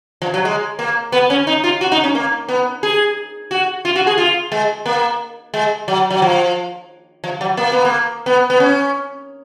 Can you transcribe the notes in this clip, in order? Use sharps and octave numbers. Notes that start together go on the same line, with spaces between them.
F3
F#3
G#3
A#3
B3
C#4
D#4
F4
F#4
D#4
C#4
A#3
B3
G#4
F#4
F4
F#4
G#4
F4
G#3
A#3
G#3
F#3
F#3
F3
F3
F#3
A#3
B3
A#3
B3
B3
C#4